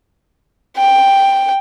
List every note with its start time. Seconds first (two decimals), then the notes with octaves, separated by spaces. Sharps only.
0.77 G5